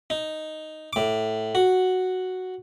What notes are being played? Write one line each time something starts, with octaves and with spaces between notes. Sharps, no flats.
D#4
A2 D6
F#4